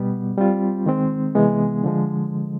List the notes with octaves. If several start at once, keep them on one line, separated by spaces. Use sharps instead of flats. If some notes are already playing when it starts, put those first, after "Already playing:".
Already playing: B2 G3 B3
G3 C4 F4
D#3 G#3 C4
C3 E3 G#3 B3
D3 F3 G#3